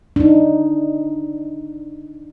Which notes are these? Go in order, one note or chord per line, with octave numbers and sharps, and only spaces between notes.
D4 D#4